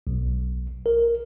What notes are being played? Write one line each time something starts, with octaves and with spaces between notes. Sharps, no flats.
B1
A#4